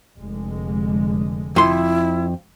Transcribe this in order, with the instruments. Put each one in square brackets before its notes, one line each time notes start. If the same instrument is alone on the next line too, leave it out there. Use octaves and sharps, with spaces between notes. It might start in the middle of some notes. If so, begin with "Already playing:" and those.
[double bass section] F1 D3 G#3
[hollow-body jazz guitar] F2 C6 [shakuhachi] E4